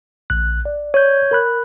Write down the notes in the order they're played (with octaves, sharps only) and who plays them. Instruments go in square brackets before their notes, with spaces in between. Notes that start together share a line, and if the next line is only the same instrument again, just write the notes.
[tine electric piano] A#1 F#6
D5
[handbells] C#5 G6
[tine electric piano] A#4 B5 F#6